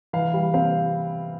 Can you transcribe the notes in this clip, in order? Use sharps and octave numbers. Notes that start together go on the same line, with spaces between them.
E3 F5
G3
C4 F5